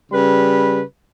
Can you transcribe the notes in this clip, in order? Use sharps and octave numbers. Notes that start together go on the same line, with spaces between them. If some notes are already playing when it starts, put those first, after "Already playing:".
C#3 G3 B4 B5